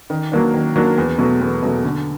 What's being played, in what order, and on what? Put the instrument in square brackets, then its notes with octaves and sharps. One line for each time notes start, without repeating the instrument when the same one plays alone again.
[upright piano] D#3
F#3 A#3 D4
D#3
F#3 A#3 D4
E2
B2 F#3 A3
E2
B2 F#3 A3
D3